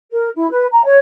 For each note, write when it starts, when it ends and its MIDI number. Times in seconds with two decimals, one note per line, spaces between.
0.11 0.29 70
0.36 0.49 64
0.50 0.65 71
0.71 0.85 82
0.85 0.97 73